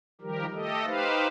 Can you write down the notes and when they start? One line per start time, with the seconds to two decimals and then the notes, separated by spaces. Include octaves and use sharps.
0.21 D#3 F3 G3 G4 A#4
0.53 A3 G4 A4 D#5
0.85 D#4 G4 B4 C5 F5